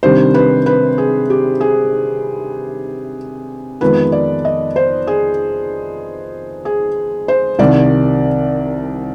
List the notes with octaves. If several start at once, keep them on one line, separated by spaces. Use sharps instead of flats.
C3 D#3 G3 D4 C5
B4
B4
G#4
G4
G#4
F2 D#3 G#3 B3 B4
D5
D#5
C5
G#4
G#4
C5
C2 C3 D#3 D5